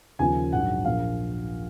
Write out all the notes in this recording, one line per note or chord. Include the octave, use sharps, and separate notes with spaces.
D#2 C#3 F3 G#5
A#1 G#2 F#3 F#5
A#1 A#2 F3 F5